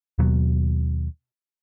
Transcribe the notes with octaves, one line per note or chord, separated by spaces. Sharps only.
D#2 B2 F#3